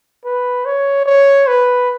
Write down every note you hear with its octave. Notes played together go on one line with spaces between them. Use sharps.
B4
C#5
C#5
B4